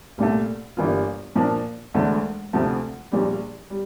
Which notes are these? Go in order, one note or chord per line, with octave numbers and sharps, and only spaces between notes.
C2 A#2 A3
G1 G2 E3 A#3 F4
A#2 F3 A#3 D4
E1 D2 D3 A3 D4
D2 C3 F3 A3
A#1 A#2 G3
G3